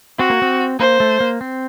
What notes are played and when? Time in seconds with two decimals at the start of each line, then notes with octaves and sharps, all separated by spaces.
0.19 C4 F#4
0.30 A#3
0.42 C4
0.79 A#3 C5
1.00 A3
1.20 A#3
1.41 C4